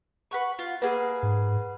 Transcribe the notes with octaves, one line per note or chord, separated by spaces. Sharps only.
B4 F#5 C#6
F4
A#3 G#4 B4 F#5
G#2